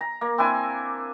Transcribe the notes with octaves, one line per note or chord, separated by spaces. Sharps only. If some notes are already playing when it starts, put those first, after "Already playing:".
A#5
A#3
C4 D4 E4 G#5